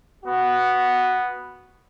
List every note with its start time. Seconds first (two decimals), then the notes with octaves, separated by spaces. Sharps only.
0.24 B3 F#4